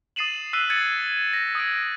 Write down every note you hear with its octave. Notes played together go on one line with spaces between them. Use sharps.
D#6 A6 C7 D#7 E7 F#7
E6 F#6 B6 C7 D#7
G#6 A6 C#7 D#7
A#6
D#6 G#6 D7